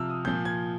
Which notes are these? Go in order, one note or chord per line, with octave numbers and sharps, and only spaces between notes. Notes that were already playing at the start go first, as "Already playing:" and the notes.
Already playing: C3 F3 E6 F6
D#6
A#2 F3 G6
G#6